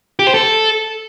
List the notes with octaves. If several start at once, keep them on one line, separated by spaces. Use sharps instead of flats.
G4
C5
A4